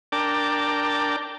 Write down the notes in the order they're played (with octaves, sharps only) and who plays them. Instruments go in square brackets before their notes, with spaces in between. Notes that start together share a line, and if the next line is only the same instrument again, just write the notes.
[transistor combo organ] D4 A#4 G5 A5 D6